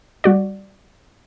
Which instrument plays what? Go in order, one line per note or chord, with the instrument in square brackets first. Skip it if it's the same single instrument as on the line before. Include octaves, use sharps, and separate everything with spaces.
[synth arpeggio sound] G3 F#4 D5